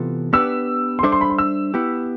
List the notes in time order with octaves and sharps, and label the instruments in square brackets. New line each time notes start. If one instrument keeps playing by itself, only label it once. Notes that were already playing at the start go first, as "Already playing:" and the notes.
Already playing: [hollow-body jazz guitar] C3 E3 B3 F4 A4
[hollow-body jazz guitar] B3 D4 G4 B4 [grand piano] E6
[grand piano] C6
[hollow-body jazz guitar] G3 D4 A4 C5 E5 [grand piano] D6
[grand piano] C6
B5
C6
E6
[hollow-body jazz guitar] B3 E4 G4